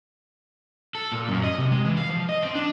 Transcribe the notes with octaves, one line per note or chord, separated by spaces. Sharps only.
A4
A#2
F#2
D#5
C3
G#3
E3
F5
F3
D#5
C4
D4